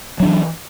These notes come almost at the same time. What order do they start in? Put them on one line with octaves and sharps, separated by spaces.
F#3 D4 E3